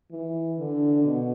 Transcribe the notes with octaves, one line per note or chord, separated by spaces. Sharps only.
E3
D3
B2